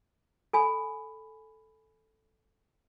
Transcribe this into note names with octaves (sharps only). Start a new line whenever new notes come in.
A4 G#5 B5